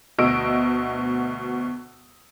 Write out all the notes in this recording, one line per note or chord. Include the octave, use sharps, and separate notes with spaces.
D2 B2 D#5 E6 D7